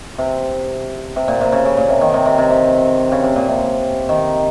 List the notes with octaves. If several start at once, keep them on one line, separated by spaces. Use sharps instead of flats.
C3
C3
A#2
C3
C#3
C#3
A#2
C3
D#3
C3
C3
C3
C3
C#3
C3
A#2
C3
D#3